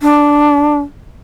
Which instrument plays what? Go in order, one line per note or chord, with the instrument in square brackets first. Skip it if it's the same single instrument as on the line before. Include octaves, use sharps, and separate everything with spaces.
[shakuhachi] D4